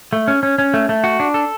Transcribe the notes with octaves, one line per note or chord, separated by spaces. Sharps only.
A3
C#4
C#4
C#4
A3
A3
F#4
D4
A4